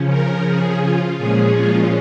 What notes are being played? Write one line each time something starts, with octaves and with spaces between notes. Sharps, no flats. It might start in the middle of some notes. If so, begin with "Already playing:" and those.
Already playing: C#3 F3 C#4
A#4
G#4
F4
A#2 F3 G#3 C#4 G#4
F4